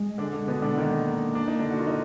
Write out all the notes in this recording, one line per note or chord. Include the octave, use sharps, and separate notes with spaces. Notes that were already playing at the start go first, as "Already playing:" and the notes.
Already playing: G#3
D3 D4
D3 D4
B2 B3
D3 D4
D#3 A#3 D#4
D4
D#4
D3 D4
F#4
F4
D#4